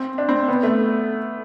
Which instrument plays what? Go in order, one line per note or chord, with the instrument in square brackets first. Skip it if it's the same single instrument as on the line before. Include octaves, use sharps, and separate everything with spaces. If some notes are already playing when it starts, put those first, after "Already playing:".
Already playing: [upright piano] C4
D4
C4
B3
A3